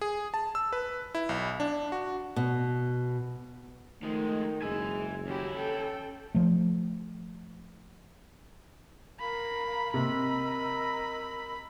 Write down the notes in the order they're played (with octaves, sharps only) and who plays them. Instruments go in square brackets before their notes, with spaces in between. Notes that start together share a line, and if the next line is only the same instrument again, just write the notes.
[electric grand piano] G#4
A5
E6
B4
E4
B1
D4
F#4
[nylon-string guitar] B2
[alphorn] D#3 [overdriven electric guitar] F3 G#3 [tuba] A3 [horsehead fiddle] D#4
[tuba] F#1 [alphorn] G#3 [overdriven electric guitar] E5 G#5
[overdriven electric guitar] D#2 E4 [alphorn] C#4 [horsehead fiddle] F#4 G4
[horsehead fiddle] A4 G5
[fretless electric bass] F3 A3
[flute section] A#4 F5 [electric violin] B5
[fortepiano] C3 [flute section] A#4 D#5 E6 [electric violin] B5